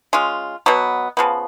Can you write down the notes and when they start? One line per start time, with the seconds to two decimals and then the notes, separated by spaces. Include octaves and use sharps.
0.13 G#3 C#4 F4
0.66 B2 F#3 B3
1.17 C#3 F3 B3